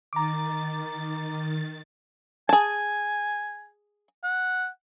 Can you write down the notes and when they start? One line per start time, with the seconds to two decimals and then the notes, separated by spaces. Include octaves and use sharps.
0.13 D#3 A#5 D6 A6
2.49 G#4 G#5 A5
4.24 F#5